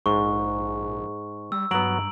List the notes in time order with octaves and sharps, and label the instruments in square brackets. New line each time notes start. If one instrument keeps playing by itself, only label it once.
[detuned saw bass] A#1 [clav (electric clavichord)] G#2 [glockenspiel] C#6
[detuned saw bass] G3 [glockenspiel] E6
[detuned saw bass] G2 [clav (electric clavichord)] F#3 B3 [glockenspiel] A#5 D7 F#7